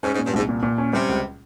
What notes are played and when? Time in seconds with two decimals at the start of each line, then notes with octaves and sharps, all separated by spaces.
0.03 G#2 C#4
0.14 G#2
0.19 A#2
0.26 G2
0.34 C2 G#2
0.49 A#2
0.63 A#2
0.78 C#4
0.93 C3 G3
1.09 C#2